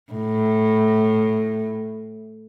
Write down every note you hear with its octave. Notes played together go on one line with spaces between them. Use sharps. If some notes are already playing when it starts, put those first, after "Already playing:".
A2